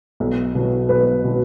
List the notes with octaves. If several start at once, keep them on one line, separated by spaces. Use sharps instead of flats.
B1
B2 F#3
B1 B4
B2 F#3